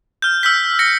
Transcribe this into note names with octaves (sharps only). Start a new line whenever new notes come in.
F6 G6
E6 F6 G6 B6
A#6 C#7